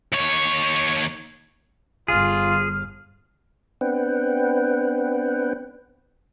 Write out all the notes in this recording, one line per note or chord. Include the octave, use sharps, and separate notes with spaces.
D#2 C#5
G1 F4 G#4 F6
B3 C4 D4 B4 F#5 G5